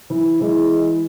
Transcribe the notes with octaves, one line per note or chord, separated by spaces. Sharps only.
E3
E3 G#3